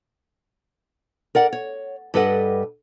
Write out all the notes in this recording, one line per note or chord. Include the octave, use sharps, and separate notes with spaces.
A#4 D5 F#5
C#5
G2 G3 A4 B4 D#5 F#5